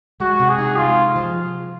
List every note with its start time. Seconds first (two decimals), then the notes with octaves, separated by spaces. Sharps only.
0.20 G#3 F#4
0.40 C3
0.49 G#4
0.58 D#4
0.78 G#3 F4
0.96 C3
1.16 F3